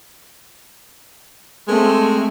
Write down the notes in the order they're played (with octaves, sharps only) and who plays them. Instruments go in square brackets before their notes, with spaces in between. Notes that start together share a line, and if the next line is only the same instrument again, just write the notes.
[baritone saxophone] G#3 [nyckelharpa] A3 C4